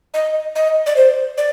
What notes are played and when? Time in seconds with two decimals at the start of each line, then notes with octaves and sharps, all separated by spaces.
0.14 D#5
0.55 D#5
0.86 D5
0.96 C5
1.38 D5